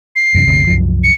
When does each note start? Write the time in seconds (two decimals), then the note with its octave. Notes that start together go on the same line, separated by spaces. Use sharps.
0.16 C7
0.35 F#2 C3 E3
0.47 G1 D2 C3
0.67 C2 F#2 F3
1.04 C#7